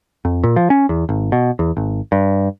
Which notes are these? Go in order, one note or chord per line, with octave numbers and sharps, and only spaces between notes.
F2
A#2
F3
C#4
E2
G#1
B2
E2
G#1
G2